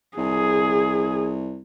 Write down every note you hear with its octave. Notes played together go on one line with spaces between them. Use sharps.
C2 G#4